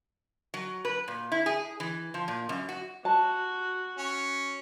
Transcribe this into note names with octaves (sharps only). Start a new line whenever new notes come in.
F#3
B4
A#2
E4
G#4
E3
F3
A#2
F#2
F#4
F#4 A5
C#4